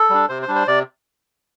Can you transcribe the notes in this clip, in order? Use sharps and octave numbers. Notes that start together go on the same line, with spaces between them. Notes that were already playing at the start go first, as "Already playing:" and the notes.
Already playing: A4
G3 D4
C3 C5
C5
G3 D4
C5
C3 D5